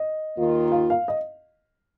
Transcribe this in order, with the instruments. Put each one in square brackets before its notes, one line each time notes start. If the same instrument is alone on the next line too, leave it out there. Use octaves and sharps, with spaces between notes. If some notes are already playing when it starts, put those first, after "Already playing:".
Already playing: [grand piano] D#5
[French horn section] D#2 D#3 A#3 F4
[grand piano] F5
F5
D#5